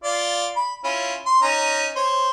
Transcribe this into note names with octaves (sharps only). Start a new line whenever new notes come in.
F4 D5
B5
C#4 E4 F4
C6
C#4 D#4 A#5
C5 C#5